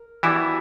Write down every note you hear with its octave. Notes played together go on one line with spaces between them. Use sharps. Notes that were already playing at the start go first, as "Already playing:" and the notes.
Already playing: A#4
E3 G3 B3 D4 E4 F#4